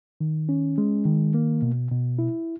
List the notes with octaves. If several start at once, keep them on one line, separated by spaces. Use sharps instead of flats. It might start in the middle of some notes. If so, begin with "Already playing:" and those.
D#3
C#4
G#3
D#3
A#3
B2
B2
E4